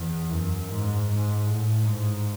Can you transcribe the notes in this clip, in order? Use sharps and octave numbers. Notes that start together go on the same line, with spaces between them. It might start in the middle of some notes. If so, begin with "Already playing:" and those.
Already playing: E2
F#2
G#2
G#2
A2
G#2